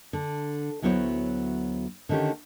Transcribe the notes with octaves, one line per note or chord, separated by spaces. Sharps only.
D3
D2 F#3 B3 E4 C5 C#5
D3 D#3 A3 C#4 G4